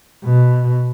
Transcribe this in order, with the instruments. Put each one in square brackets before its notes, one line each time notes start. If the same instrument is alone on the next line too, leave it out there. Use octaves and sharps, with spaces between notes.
[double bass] B2